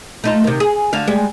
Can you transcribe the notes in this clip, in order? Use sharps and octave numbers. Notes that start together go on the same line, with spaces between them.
A3 D#4 F4
C3 D#3
G#4
D2 D3 F5
G3 G#3